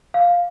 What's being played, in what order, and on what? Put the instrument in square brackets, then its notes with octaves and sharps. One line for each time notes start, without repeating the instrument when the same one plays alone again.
[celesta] F5